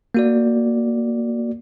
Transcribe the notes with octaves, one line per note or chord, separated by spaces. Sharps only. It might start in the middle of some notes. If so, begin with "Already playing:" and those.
A#3 F#4 D5